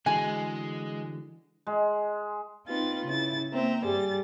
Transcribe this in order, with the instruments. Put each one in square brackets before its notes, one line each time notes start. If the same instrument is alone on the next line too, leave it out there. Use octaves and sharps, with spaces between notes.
[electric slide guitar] D3 E3 F#4 [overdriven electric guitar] G#3 [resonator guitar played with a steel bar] G#5
[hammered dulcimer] G#3
[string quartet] C4 D#4 F4 B4 A6
C#3 E4 A6
A#3 C4 E5 A#5
G2 G3 G#4 A6